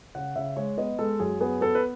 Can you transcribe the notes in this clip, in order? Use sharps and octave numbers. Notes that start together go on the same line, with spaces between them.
C#3 F#5
C#3 E5
G#3 C#5
B3 D#5
G#3 A4
F#2 G#4
B3 G#4
B3 A4
B4